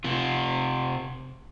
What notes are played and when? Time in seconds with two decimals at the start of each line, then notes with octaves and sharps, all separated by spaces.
0.04 C3 F4